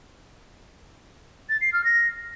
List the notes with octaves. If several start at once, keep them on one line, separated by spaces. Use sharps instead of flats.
A6
C7
F6
A#6